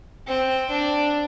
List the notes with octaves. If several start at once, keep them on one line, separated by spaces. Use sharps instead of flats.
C4
D4